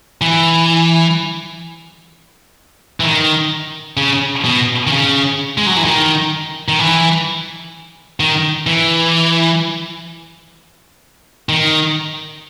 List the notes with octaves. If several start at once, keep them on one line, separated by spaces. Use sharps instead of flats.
E3
E3
D#3
C#3
B2
D#3
C#3
G#3
F#3
E3
D#3
D#3
E3
D#3
E3
D#3